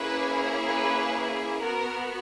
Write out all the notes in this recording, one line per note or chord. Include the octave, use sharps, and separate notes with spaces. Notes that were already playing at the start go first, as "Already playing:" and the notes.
Already playing: A#3 C#4 E4 G#4 B4
B4
B3 F#4 A#4